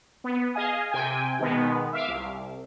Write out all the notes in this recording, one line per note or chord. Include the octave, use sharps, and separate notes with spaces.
B3
G#4 D#5 F5 G#5 D#6
C3 G5 G#5
B2 D#3 G#3 B3
E5 F5 D6
C2